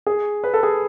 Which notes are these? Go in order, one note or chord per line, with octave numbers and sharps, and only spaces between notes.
G#4
B4
A4
G#4